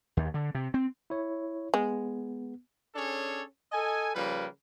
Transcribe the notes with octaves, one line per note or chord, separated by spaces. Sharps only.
D#2
D3
C3
C4
E4 C#5
G#3 B3
C#4 D4 G#4 A4 C#5
A4 D#5 G#5
C#3 F3 G3 A#3 B4